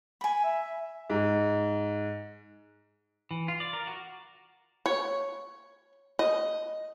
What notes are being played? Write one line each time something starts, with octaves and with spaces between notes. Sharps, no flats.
G#5 B5
E5
G#2
E3
F4
D5
A#4
F#4
C#5
D#5